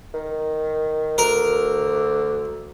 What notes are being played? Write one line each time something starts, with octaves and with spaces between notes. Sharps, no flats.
D#3
D2 A#4